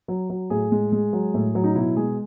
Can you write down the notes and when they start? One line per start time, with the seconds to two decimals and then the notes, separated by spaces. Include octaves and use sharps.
0.08 F#3
0.30 F#3
0.50 A2 G#4
0.72 G#3
0.92 G#3
1.13 F#3
1.34 A2
1.55 F#3
1.64 D#4
1.75 B2 E4
1.97 G#3 G#4